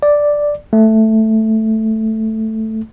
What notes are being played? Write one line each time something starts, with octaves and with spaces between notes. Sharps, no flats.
D5
A3